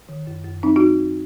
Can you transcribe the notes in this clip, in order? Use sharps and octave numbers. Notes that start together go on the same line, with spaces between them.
D#3
F#2
F#2
F#3 C4 D#4
D#4 F#4